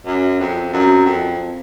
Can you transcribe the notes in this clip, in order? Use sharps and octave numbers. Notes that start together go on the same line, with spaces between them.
F#2
F2
F#2
F2